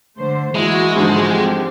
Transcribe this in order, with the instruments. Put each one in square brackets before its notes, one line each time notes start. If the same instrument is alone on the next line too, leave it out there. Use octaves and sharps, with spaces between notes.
[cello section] D3 A3 C5
[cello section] E3 A#3 F#4 [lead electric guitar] G#3 [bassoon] E4
[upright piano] G#2 D3 F3
[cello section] C4 [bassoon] G4